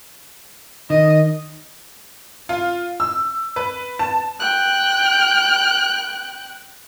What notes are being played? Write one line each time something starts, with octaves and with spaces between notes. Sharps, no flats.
D#3 D#5
F4
E6
B4
A5
G5 F#6